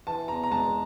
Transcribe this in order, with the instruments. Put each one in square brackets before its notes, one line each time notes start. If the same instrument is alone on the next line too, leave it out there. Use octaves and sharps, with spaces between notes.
[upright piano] E3 A5
E2 A#5
A#5
G#3 A5